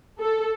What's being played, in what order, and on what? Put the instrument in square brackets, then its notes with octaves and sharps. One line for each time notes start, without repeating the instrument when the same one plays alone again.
[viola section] A4